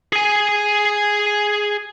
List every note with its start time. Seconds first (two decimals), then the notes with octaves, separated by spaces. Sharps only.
0.13 G#4 G#5